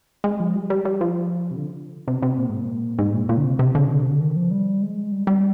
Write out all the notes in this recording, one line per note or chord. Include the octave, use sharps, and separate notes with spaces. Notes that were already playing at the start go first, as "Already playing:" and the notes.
G#3
F3
G3
G3
G3
F3
C3
D3
C3
C3
A#2
G#2
A#2
G#2
A#2
A#2
D3
C3
C3
D3
C3
D3
C3
D3
D#3
F3
G3
G#3
G3
G3